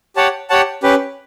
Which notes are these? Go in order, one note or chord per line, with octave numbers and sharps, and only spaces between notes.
G4 C#5 F#5 A5
G4 C#5 F#5 A5
C#4 G4 B4